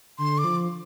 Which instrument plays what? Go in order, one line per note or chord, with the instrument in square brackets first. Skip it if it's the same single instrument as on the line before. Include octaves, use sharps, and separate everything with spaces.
[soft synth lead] D3 [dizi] C6
[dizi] D6
[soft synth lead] F3